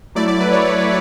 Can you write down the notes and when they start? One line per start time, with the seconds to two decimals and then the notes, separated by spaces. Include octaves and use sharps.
0.15 F#3 A3 E4 D5
0.28 D5
0.41 B4
0.52 C#5